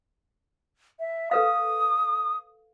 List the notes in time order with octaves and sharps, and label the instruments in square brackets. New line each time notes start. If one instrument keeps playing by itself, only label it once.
[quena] E5
[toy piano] A4 B4 F5 [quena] D#6